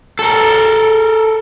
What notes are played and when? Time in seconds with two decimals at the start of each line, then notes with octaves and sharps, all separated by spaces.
0.19 A4 A#4